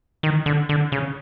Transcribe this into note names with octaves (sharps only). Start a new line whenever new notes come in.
D#3
D3
D3
C#3